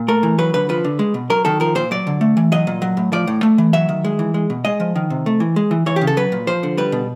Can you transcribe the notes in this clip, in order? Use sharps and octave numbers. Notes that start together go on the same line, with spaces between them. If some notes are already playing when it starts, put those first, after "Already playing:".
Already playing: A#2
A3 A#4
E3
F#3 B4
D3 B4
F3 B4
D3
G#3
B2
F#3 A#4
D#3 A4
F3 A#4
A#2 C5
F#3 D5
D3
A3
E3
F#3 D#5
A#2
F#3
A2
F3 D5
A2
A3
E3
F#3 E5
D#3
G#3
E3
G#3
B2
G#3 D#5
F3
D#3
C3
A3
E3
G#3
E3
E3 C#5
G4
C#3
A4
F#3 B4
A#2
F3 C5
D3
G3 B4
B2